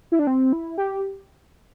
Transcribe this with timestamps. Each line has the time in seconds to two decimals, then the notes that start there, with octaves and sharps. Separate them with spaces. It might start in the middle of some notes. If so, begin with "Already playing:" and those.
0.12 E4
0.19 D4
0.27 C4
0.53 E4
0.78 G4